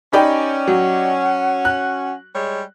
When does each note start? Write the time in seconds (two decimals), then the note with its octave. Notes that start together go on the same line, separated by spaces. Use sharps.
0.13 C#4 D#4 G4 D5 G5 B5
0.68 F#3 F#5
1.65 F#6
2.35 G3 G#3 C#5